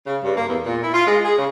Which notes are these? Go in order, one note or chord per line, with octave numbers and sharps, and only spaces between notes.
C#3
G2
A#3
E2
A#2
E4
F4
G#3
G#4
C#3